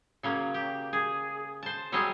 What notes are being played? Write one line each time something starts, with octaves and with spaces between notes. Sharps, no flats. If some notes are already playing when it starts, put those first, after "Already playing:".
C#3 F#3 A#3
G4
G#4
C5 A5
F#3 G3 C4 G#4 D#5